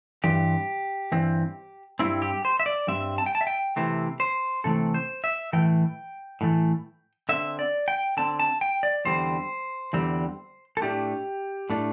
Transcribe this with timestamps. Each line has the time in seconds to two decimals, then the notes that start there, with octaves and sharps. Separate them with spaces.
0.24 G2 E3 C4 G4
1.12 G2 E3 C4
1.99 G2 G3 C4 E4
2.22 G4
2.45 C5
2.60 E5
2.66 D5
2.87 G2 G3 C4 E5
3.18 A5
3.26 G5
3.35 A5
3.41 E5
3.47 G5
3.76 C3 E3 A3 C4
4.20 C5
4.64 C3 E3 A3 C4 A4
4.94 C5
5.24 E5
5.53 A2 E3 A3 G5
6.41 A2 E3 A3
7.29 D3 C4 E5
7.59 D5
7.88 G5
8.17 D3 C4 A5
8.39 A5
8.61 G5
8.83 D5
9.05 E2 D3 G3 C4 C5
9.93 E2 D3 G3 C4
10.77 A4
10.81 A2 A3 D4 G4
11.70 A2 A3 D4